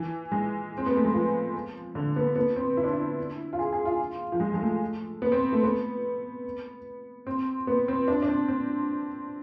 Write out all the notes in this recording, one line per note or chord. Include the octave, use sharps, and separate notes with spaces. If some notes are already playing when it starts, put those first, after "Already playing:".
Already playing: E3
G#3
C4
B3
A3
G#3
F3
D3
B3
B3
C4
E4
D4
E4
F4
G#4
G#4
F4
F3
G#3
G#3
A3
B3
C4
A3
B3
C4
B3
C4
D4
D4
C4
C4